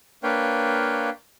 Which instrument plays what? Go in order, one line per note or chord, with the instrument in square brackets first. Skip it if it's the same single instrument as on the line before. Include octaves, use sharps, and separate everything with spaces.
[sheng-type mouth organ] A#3 D4 B4 C#5 F5 G5